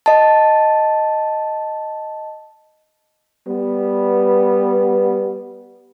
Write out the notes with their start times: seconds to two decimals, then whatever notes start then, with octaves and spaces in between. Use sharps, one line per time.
0.06 D#5 A5
3.47 G3 B3